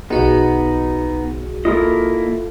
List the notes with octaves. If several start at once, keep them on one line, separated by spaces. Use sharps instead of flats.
B1 B3 D#4 F#4 G#4
A#3 E4 F4 A4 D#5